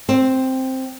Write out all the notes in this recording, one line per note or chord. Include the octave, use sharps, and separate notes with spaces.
C4